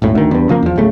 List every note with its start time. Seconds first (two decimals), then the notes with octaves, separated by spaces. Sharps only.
0.02 D#1 G#1 A2
0.15 D2 D#3
0.31 E2 G2
0.49 C#3 F3 A#3
0.63 E2 F3
0.76 D1 G1 C#3 A3